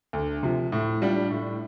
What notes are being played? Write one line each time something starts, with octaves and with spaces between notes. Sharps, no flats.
D2
C3 F3
A2
G3 D4 F4
A2